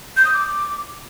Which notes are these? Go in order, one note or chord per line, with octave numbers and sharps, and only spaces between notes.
G6
D#6
D6